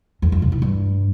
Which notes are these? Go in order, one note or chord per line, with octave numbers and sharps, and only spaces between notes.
E2
F2
C3
E3
G2